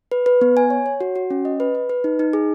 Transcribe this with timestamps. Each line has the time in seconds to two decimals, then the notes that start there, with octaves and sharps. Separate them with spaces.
0.12 B4
0.26 B4
0.41 B3
0.57 G#5
0.70 C#5
0.86 C#5
1.01 F#4
1.16 F#4
1.30 C#4
1.45 D#5
1.60 B4
1.75 B4
1.90 B4
2.04 D#4
2.19 D#4
2.33 G#4